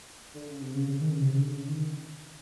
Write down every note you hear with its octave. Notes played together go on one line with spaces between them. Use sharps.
D3
C#3
C3
C#3
C#3
D#3
C#3
C3
C#3
D3
C#3
D#3